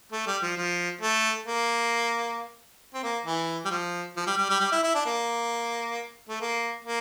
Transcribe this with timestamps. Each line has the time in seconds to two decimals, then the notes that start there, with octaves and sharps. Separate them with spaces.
0.12 A3
0.27 G3
0.42 F3
0.57 F3
1.01 A3
1.47 A#3
2.94 C4
3.03 A#3
3.26 E3
3.65 G3
3.71 F3
4.16 F3
4.27 G3
4.38 G3
4.49 G3
4.60 G3
4.72 E4
4.83 E4
4.95 D4
5.05 A#3
6.29 A3
6.41 A#3
6.85 A#3